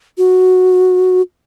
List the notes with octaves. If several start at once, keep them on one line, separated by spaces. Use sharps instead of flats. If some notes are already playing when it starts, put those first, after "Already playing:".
F#4